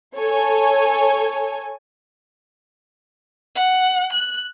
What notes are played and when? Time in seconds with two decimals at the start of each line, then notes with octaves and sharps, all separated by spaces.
0.16 A4 C#5 G#5
3.55 F#5
4.13 F#6